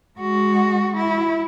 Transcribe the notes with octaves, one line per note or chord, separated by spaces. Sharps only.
G#3 F#4
E4